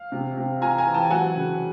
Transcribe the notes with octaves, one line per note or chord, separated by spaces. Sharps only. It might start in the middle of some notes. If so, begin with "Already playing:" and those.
Already playing: F5
C3
C3
F4 G#5 A#5
G#5 A#5
E3
G5 A5
F#3 F#5 G#5
C#3